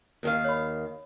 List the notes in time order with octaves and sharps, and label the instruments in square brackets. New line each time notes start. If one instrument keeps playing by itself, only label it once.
[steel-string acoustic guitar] D#2 D#3 F5
[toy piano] C#5 B5